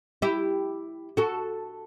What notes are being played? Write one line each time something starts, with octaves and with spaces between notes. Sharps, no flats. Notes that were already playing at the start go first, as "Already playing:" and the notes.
E4 G4
F#4 A4